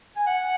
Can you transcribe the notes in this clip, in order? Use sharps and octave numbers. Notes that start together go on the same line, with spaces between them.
G#5
F#5